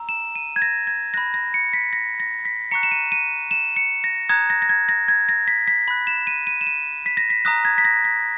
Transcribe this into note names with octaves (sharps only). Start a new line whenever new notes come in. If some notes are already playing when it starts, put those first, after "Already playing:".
Already playing: A#5 E6
E7
D#7
G#6
A#6
G#6
B5 F#6 A#6
A#6
C#7
B6
A#6
A#6
B6
A#5 C#6 F#6 C#7
E7
D#7
D#7
E7
C#7
A#6
A#5 D#6 F#6 G#6
A#6
A#6
G#6
A#6
G#6
A#6
B6
B6
B5 F#6
E7
D#7
D#7
E7
D#7
B6
A#6
B6
A#5 D#6 F#6 A#6
G#6
B6
A#6
B6